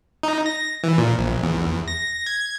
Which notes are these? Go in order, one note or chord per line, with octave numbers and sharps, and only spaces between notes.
D#4
A#6
E3
A#2
A#1
E2
A#6
G#6